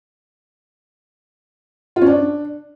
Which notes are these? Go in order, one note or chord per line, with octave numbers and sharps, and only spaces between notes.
F4
C#4
D4